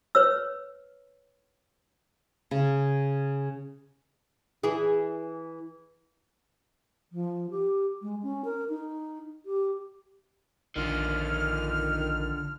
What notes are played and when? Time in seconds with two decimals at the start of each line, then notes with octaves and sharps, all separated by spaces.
0.15 B4 C#5 E6
2.51 C#3
4.63 E3 E4 G#4
7.12 F3
7.50 G4
8.02 G#3
8.23 C#4
8.45 A#4
8.69 D#4
9.46 G4
10.76 A#1 D3 D#3 F4 F6